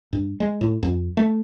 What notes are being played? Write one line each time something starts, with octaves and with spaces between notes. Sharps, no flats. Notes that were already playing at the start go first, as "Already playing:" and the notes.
G2
G#3
A2
F2
A3